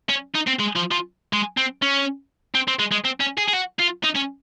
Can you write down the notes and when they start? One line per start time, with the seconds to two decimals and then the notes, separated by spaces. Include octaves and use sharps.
0.09 C#4
0.35 D#4
0.47 C4
0.59 G#3
0.76 F3
0.91 F3
1.33 G#3
1.57 C4
1.82 C#4
2.55 C4
2.68 C4
2.79 G#3
2.92 G#3
3.05 C4
3.20 C#4
3.38 G#4
3.48 G#4
3.53 F#4
3.79 F4
4.03 D#4
4.15 C#4